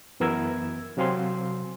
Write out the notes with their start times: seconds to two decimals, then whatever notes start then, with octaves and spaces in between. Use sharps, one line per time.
0.20 F#2 E3 B3 A#4 E6 G#6
0.97 C3 F#3 C4 F5 G#5 C6